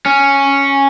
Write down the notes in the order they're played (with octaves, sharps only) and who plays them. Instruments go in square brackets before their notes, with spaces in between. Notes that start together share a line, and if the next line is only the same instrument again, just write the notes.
[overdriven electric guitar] C#4